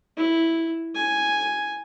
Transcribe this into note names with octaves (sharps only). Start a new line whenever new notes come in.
E4
G#5